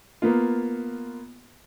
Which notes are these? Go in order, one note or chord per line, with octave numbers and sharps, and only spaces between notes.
A#3 B3 F4